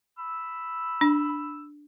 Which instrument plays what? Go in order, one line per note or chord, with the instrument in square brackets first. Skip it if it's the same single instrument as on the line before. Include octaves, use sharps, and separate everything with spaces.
[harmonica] B5 E6
[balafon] D4